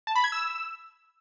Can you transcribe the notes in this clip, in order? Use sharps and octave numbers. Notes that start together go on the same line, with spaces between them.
A5
B5
G#6
E6